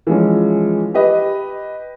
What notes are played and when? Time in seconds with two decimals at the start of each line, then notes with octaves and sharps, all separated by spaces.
0.07 E3 F3 G#3 C#4
0.94 G4 B4 D#5